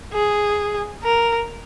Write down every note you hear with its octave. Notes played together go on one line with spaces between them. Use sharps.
G#4
A#4